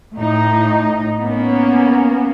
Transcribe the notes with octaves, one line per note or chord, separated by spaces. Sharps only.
A2 D#4
A#3 B3 C#4